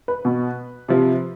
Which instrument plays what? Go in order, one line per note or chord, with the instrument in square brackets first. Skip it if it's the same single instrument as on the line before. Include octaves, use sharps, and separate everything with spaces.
[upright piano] B4
B2
C3 F3